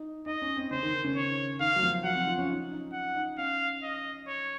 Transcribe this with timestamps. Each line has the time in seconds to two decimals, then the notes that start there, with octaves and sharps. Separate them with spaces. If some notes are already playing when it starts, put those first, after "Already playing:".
Already playing: D#4
0.26 D#4 D#5
0.42 C#4
0.56 C4
0.71 C#3 C5
0.83 D#3
0.94 D#3
1.04 C#3
1.16 C#5
1.60 D#3 F5
1.76 F#3
1.83 F3
2.04 F#3 F#5
2.15 C4
2.27 F4
2.38 C#4
2.49 D#4
2.72 D#4
2.93 F#5
3.15 D#4
3.38 C#4 F5
3.83 D#5
4.27 C#5